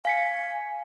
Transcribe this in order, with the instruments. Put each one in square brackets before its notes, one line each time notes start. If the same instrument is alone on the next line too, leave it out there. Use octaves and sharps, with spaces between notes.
[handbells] F5 B6 C#7 [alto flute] G#5